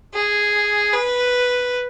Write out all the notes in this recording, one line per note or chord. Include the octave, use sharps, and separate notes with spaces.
G#4
B4